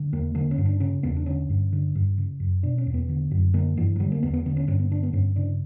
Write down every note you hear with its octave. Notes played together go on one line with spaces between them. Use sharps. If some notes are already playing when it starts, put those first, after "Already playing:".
Already playing: D3
E2 A#3
D3 A#3
C#4
G2
D4
C#3 C#4
E2 B3
D4
D3 C#4
G2
D3
G2
C#3
F#2
B2 D4
C#4
E2
B3
D3
F#2
D3 A#3
G2 E3
F#3
D3 G3
A#3
E2 B3
B3
D3 B3
C#4
G2 C#4
B3
D3 D4
B3
G2 C#4
C#3 D4